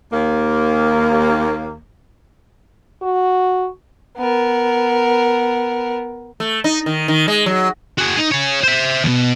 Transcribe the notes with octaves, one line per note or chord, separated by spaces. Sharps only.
D#2 A#3
F#4
B3 A#4
A3
D#4
D#3
D#3
G#3
F#3
F#4 G#4
D#4
G#4 C#5
C5 E5
D#2 B2